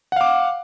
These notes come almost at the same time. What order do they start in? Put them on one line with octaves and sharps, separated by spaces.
F#5 F5 D6